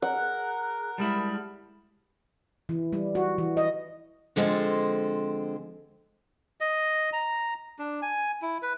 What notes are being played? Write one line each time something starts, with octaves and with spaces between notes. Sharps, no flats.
G#4 A#4 F#5 F#6
G3 G#3 E4 A5 B5 F6
E3
G3
F#4
E3
D#5
D3 F3 G#3 C4 F4 A4
D#5
A#5
D4
G#5
E4
B4